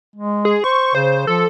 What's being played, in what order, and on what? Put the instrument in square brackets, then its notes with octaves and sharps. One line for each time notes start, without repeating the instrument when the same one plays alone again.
[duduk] G#3
[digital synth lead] G#4
[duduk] C5 [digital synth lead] C#6
[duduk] C#3 [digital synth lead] C5
[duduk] F3 [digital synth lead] A4